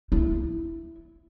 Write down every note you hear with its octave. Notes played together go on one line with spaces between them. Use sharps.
E4